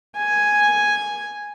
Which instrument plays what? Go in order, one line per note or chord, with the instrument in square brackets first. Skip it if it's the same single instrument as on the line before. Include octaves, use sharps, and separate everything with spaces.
[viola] G#5